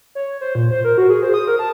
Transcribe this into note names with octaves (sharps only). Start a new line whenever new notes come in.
C#5
C5
A#2
C5
A#4
F#4
G#4
C5
D#6
A#4
A5